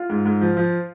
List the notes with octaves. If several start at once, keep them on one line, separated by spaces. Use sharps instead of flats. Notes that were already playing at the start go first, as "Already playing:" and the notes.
Already playing: F4
G#2
G#2
F3
F3